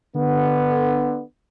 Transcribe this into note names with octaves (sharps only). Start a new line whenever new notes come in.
D3 B3